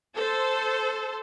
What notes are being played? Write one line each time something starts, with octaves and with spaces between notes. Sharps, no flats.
A4 C5